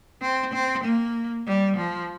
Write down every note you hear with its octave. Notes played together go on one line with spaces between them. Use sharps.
C4
C4
A#3
G3
F3